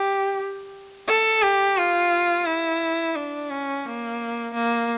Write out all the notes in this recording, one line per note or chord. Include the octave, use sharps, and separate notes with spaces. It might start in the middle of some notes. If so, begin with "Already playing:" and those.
Already playing: G4
A4
G4
F4
E4
D4
C#4
A#3
A#3